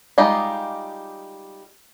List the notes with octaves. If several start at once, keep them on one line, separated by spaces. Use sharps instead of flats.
G3 G#3 D#4 F4 G4